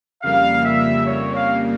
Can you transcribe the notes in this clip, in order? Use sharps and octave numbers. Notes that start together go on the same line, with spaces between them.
F2 C#3 G3 A#3 F5
E5
C#5
F5